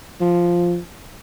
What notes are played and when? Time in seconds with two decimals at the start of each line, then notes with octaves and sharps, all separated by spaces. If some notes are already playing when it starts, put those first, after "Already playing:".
0.21 F3